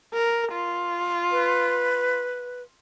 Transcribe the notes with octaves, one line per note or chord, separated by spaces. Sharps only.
A#4
F4
B4